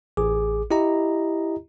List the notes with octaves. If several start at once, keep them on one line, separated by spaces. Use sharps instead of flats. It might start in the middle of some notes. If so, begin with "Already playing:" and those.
A1 G#4 D6
E4 G4 D#5 A#5